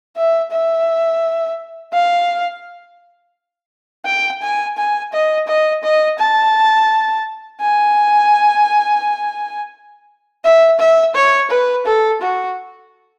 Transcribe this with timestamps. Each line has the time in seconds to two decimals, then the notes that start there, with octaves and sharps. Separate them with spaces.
0.17 E5
0.52 E5
1.94 F5
4.06 G5
4.42 G#5
4.77 G#5
5.13 D#5
5.48 D#5
5.83 D#5
6.19 A5
7.61 G#5
10.45 E5
10.79 E5
11.15 C#5
11.50 B4
11.86 A4
12.21 F#4